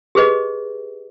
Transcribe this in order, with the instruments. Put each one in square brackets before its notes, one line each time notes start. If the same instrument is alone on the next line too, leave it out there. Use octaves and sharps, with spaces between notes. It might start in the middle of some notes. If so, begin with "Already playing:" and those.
[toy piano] G4 G#4 B4 D#5